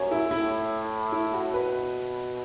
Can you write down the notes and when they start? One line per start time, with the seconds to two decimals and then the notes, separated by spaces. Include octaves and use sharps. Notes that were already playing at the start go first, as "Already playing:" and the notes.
Already playing: F#2 C#5
0.11 E4
0.31 A2 E4
1.12 E4
1.34 F#4
1.53 B2 B4